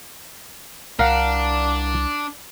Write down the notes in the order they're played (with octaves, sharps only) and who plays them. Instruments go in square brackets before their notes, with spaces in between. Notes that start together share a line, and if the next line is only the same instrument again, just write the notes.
[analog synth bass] C2 [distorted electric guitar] D4 [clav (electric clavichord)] A#4 F5 F#5